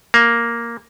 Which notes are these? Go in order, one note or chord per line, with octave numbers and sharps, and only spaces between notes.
A#3